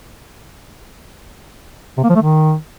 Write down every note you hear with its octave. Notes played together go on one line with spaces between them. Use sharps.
C3
A#3
F3
A3
D#3